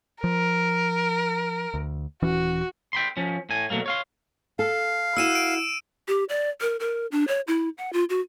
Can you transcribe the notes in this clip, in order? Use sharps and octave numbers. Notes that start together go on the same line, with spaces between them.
F3 A#4
D2
D#1 E3 C#4 F#4
G5 B5 C6
F3 C#4
A2 G#5
B2 F#3 A3 A#3
C#5 F5 C6
A4 F5
E4 F#4 F#5 E6 D#7 E7
D7
G4
D5
A#4
A#4
D4
C#5
E4
F#5
F4
F#4